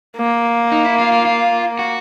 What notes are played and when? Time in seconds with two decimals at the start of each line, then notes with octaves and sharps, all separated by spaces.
0.18 A#3
0.72 D#4
0.85 E4
0.99 F4
1.12 F4
1.25 F4
1.79 F#4